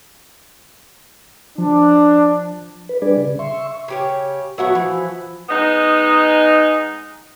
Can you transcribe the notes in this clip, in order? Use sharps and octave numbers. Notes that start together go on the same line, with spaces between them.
F3 D4
B4
G3 D4 G#4 B4 D5
C#3
E5 C6 C#6
C#3 G4 C#5
F#3 A3 B3 F#4 E5 F#5
E3 F3
G#3 B3 D#4